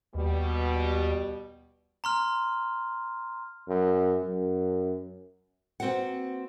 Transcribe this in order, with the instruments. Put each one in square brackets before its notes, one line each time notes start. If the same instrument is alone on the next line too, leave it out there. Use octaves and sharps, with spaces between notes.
[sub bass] D#2 [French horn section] B2 G3
[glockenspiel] A#5 C6 F6
[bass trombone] F#2
F#2
[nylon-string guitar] A#3 C4 F#4 B4 F#5